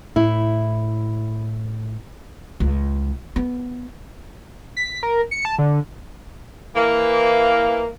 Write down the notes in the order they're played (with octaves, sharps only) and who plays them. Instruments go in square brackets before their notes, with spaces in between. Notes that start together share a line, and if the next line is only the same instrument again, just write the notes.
[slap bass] A2 [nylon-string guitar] E4
[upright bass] C#2
B3
[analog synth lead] B6
A#4
C#7
A5
D3
[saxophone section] E3 A#3